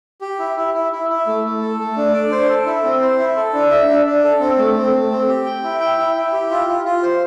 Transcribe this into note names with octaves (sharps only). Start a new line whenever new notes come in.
G4
E4
E4
E4
E4
E4
A3
A3
A4
A3
D4
D5
C5
A4
E4
C4
C5
E4
A4
D4
E5
D4
D4
A4
C4
A3
C4
A3
C4
G4
G5
E4
G5
E4
E4
G4
F4
F4
F4
C5